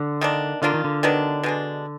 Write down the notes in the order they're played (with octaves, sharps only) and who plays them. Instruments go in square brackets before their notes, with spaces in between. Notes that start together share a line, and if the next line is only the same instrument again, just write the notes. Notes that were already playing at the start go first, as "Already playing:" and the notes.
Already playing: [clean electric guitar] D3
[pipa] D#3 A#3 D4
[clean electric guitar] D3 [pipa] A#3 D4 F4
[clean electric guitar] D#3
D3
[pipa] D#3 F#3 B3 D4
B2 G#3 D4